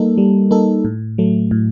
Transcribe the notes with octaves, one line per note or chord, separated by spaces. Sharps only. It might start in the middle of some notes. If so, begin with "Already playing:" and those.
Already playing: G3 A#3 D#4 A4
G3
A#3 D#4 A4
A2
F#3 A3
A2